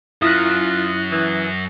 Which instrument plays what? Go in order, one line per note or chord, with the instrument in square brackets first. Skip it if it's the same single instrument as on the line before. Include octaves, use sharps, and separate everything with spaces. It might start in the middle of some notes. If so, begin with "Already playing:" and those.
[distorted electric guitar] F#2 [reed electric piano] E4 [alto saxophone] F4 [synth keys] D#6 F#6
[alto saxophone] E3